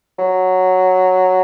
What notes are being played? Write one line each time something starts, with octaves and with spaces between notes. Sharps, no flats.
F#3